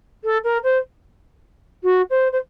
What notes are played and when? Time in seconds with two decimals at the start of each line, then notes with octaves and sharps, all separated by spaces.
0.24 A4
0.44 A#4
0.63 C5
1.83 F#4
2.10 C5
2.32 C5